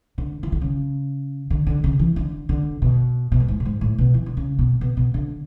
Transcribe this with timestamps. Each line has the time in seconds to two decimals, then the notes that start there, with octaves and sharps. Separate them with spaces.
0.18 D3
0.43 E3
0.52 D3
0.62 C#3
1.50 D3
1.67 D3
1.84 C#3
1.99 E3
2.16 D3
2.49 D3
2.82 B2
3.32 B2
3.40 A2
3.48 G#2
3.60 A2
3.65 G#2
3.81 A2
3.98 B2
4.14 E3
4.26 D3
4.37 C#3
4.59 B2
4.81 B2
4.97 B2
5.14 D3